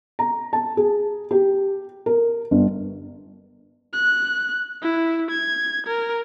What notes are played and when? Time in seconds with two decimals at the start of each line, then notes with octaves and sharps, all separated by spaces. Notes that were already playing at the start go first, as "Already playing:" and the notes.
0.19 A#5
0.53 A5
0.77 G#4
1.31 G4
2.06 A#4
2.51 G1
3.93 F#6
4.82 E4
5.31 G#6
5.87 A#4